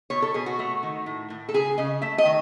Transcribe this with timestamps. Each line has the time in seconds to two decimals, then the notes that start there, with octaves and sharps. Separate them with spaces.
0.10 B2 C#5
0.22 A4
0.34 B2 G#4
0.46 F#4
0.59 A3
0.83 D#3
1.06 A2
1.30 A2
1.49 A4
1.54 C#3 G#4
1.78 C#3 D#5
2.02 A3 E5
2.18 D#5
2.26 D#3